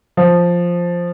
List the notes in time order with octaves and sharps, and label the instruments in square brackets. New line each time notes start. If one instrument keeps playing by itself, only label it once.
[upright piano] F3